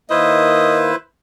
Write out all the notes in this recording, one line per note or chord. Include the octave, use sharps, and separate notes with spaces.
D#3 A#3 E4 B4 C5 D#5